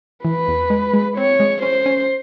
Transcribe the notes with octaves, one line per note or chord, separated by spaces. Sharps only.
E3 B4
E2
G#3
G#3
C4 C#5
G#3
C#4 C5
C#4